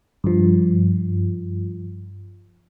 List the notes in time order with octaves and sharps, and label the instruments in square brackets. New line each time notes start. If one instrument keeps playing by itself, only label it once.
[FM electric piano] G2 F3